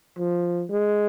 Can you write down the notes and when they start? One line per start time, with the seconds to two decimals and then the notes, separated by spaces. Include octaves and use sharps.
0.19 F3
0.70 G#3